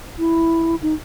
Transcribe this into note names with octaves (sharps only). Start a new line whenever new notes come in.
E4
D#4